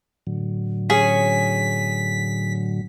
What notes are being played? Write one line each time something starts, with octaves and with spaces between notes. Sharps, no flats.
A2 D3 F#3
C#4 G#4 C#5 B6